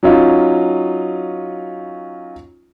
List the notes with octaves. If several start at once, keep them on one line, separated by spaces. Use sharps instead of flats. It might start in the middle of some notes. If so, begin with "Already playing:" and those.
F#3 C#4 D#4 F4